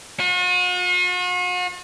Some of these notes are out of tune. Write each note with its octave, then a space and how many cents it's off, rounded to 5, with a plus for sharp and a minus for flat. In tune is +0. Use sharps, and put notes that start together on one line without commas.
F#4 -45